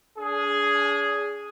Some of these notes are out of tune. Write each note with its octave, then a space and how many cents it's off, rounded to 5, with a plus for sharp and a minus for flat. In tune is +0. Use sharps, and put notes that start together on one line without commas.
D4 -40 G#4 +0